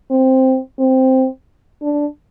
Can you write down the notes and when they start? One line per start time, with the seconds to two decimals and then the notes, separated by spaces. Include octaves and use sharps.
0.11 C4
0.79 C4
1.82 D4